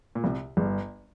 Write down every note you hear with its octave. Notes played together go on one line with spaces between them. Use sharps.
A#2
C2 C3
G1 G2